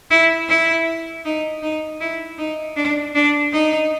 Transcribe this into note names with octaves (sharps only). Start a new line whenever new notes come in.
E4
E4
D#4
D#4
E4
D#4
D4
D4
D#4